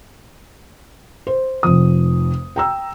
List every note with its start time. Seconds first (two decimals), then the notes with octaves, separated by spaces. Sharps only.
1.27 C5
1.63 F1 F2 D#6
2.56 G5 A#5 E6